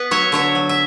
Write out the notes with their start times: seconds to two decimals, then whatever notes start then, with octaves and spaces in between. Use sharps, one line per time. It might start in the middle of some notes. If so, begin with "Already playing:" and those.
Already playing: B3 B4
0.11 F#3 C#5 E5
0.32 D3 C#5 E5
0.55 F#3
0.69 E5